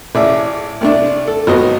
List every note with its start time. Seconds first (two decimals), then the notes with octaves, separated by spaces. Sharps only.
0.15 A1 G#4 D5 E5
0.81 C2 A3 D4
1.28 A4
1.47 G#1 F#3 B3 D#5